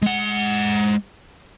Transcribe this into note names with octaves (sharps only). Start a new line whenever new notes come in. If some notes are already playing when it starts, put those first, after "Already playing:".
G#3 F#5